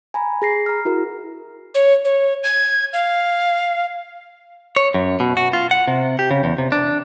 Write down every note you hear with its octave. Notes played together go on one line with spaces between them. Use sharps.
G#5 A#5 B5
G#4 A#6 C7
A#5 F6
E4 F#4 A#4
C#5
C#5
G#6
F5
C#5
F#2
B2
F#4
F4
F#5
C3
G4
C#3
E2
C3
D4